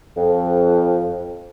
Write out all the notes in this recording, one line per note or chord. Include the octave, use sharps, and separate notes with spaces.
F2